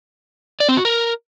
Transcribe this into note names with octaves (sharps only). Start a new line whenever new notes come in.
D5
C4
F#4
A#4